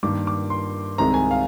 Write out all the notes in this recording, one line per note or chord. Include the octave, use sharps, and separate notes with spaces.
G2 D#3 A#3 D6
D6
C6
C2 C3 D#3 G#3 C4 A#5
G#5
F5